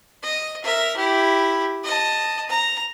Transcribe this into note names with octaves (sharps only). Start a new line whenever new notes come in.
D#5
A#4 E5
E4 G4
D#5 A5
A#5